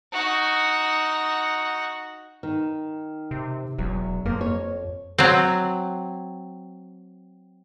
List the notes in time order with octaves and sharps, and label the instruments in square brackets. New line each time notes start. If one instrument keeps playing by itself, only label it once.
[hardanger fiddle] D#4 F#4
[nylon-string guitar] D#3
[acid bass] C3
[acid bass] E1 [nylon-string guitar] F#3
[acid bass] F2 [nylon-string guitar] A#3
[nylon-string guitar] C#5
[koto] F#3 C4